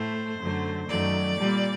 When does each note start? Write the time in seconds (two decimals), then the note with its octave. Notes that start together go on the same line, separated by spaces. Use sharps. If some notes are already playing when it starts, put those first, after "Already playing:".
Already playing: A2 A3 C5
0.39 F#2 D3 F#3 A3
0.88 F#2 D#3 F#3 A3 D5
1.39 A#2 G3